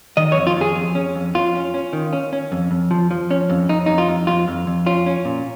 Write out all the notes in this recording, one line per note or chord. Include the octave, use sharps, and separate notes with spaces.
D#3 D#5
C#5
F2
F4
F2 G#4
F2
C#4
F2
F2 F4
C#4
C#4
D#3
C#4
C#4
F2
F2
F3
F3
C#4
F2
F2 D#4
F2 D#4
F4
F2
F2 F4
F2
F2
C#4 F4
C#4
A#2